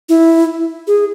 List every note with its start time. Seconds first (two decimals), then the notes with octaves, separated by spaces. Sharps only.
0.09 E4
0.87 G#4